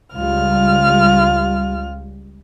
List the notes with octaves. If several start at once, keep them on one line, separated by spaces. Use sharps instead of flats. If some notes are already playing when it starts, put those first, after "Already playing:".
C#2 G3 F4 F6